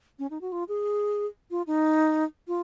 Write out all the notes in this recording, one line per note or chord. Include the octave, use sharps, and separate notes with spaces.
C#4
D#4
F#4
F4
G#4
F4
D#4
F4